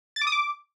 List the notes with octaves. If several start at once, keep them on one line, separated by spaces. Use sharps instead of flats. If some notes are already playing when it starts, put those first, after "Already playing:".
A6
D6
D#6
D6